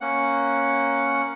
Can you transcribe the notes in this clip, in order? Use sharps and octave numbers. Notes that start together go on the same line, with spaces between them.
A#3 C#4 F#5